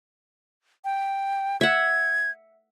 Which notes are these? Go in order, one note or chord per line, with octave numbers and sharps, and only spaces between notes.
G5
E5 F#5 G#6